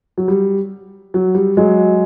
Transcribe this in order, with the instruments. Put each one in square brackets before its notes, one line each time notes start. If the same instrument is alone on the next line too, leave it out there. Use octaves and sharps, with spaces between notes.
[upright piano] F#3
G3
F#3
G3
F#3 G#3